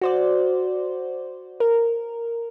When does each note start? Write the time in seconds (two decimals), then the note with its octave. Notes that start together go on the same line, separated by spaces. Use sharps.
0.02 F#4 C5 D5
1.60 A#4